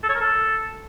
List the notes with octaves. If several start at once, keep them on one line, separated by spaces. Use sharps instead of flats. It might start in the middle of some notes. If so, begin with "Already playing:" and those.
A4
C#5
A#4
A4